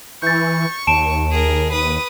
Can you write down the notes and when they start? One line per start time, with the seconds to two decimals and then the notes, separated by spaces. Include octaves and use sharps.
0.22 E3 C#6 G6 A6
0.87 D#2 A5 D7 E7
1.31 G#4 A#4
1.72 B4 D#6